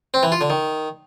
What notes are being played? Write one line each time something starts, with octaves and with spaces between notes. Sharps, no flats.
C4
E3
F4
D3
D#3